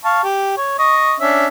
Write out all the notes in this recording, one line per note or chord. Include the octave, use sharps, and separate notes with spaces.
F5 A5 C#6
G4
C#5
D#5 C#6
C#4 D4 E5